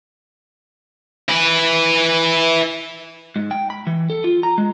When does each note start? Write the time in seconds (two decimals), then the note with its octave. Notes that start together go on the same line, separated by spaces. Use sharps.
1.29 E4 B4
3.36 G#2
3.51 G5
3.70 B5
3.87 E3
4.10 A4
4.24 F4
4.43 A#5
4.58 G#3